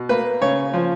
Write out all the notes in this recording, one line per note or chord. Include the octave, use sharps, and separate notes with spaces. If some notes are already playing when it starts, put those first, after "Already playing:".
Already playing: B2
A#3 B4
C#3 C#5
F3